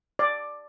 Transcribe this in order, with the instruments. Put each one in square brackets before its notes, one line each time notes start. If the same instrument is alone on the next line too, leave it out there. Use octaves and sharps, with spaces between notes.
[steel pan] D5